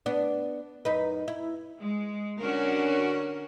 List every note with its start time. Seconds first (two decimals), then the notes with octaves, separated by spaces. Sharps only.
0.06 B3 D4
0.85 F#2 D#4 B4
1.28 E4
1.79 G#3
2.40 D3 C#4 F#4 A#4